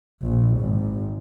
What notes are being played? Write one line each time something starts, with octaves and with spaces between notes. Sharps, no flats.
A#1
G#1